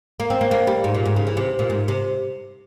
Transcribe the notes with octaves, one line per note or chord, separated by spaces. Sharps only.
A#3
C4
A#3
A#3
G3
G#2
A#2
G#2
C#3
E3
C3
A#2
G#2
C3